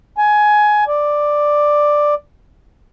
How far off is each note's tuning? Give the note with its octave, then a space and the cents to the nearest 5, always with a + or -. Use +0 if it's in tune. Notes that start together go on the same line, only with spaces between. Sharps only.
G#5 +15
D5 +5